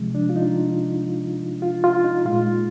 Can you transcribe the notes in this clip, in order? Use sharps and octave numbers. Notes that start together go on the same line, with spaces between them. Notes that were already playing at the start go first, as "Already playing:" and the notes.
Already playing: C3 F3 G#3
D4
F4
D#4
F4
F4
D#4
A#2 G#3 F4